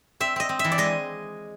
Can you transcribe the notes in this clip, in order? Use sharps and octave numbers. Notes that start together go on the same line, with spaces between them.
C4 E5
C4 D#5
C4
E5
E3
D5
G#3 D#5